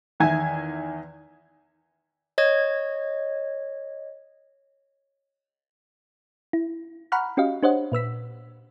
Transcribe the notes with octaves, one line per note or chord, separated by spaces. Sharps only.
E2 D#3 E5 G#5 G#6
C#5 D#5 G#6
E4
F#5 A#5 B5 C#6 F6 F#6
C#4 F#4 G4 D#5 F5
D4 G4 C5 C#5 D#5 F#5
A#2 B4 E6 B6